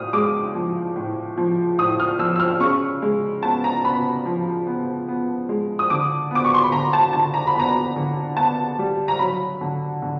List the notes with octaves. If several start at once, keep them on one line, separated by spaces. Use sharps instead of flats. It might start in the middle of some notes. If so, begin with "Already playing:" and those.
Already playing: A2 D#6 F6
G#3 D6
F3
A2
F3
A2 D#6
F6
F3 E6
E6
F6
C#3 C#6
G#3
B3 A5
A#5
B3 B5
F3
B3
B3
G#3
D#6
D3 D6
B3 D6
C#6
C6
B5
D3 A#5
A5
D3 A5
A#5
B5
B3 A#5
D3
B3 A5
G3
A#5
F#3 B5
D3
D3